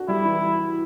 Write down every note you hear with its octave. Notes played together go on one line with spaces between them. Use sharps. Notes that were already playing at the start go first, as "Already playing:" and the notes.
Already playing: D4 F#4
G3 E4
E3